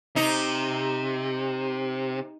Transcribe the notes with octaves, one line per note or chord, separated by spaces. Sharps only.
C3 D#4